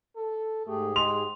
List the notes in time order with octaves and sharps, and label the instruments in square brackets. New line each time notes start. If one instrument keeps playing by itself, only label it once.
[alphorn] A4
[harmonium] G#2 G4 G#4 [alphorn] A3
[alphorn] G#3 [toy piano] C6 [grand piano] F7